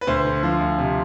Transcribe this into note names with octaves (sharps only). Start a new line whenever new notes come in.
B4
D2 C5
D3
F3
D2
C3